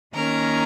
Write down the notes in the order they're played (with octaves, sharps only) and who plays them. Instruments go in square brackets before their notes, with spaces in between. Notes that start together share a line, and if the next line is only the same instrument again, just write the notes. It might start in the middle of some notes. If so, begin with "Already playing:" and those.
[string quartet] D#3 A#3 C#4 A#4 A#5